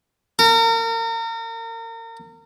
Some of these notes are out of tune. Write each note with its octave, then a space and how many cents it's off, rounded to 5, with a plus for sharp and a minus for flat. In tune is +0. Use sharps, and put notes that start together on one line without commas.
A#4 -35